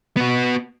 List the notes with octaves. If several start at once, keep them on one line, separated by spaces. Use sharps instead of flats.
B3 F#4